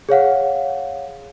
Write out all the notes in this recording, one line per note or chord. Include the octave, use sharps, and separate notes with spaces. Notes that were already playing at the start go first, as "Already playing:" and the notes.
G#4 C#5 F5 F#5